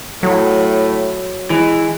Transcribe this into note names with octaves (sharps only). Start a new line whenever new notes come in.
A2 F#3
E3 G#3